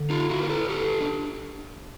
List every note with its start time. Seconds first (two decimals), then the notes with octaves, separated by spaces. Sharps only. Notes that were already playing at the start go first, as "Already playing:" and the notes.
Already playing: D3
0.10 D#4 F4
0.30 E4 F#4
0.40 A#4
0.50 A4 B4
0.69 G4 A4
1.01 D4